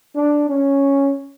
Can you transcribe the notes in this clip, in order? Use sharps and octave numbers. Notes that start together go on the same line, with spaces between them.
D4
C#4